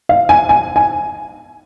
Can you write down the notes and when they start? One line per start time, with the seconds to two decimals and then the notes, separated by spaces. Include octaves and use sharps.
0.09 F5
0.29 G#5
0.49 G#5
0.76 G#5